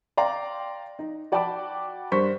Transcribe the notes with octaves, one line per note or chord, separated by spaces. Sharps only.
D5 F5 G5 A#5 C6
D#4
F#4 D5 G5 A5 B5 D6
G2 A#4 C5 C#6 B6